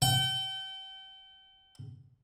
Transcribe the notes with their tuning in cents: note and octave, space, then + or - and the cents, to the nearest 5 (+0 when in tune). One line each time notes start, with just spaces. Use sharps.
G5 -35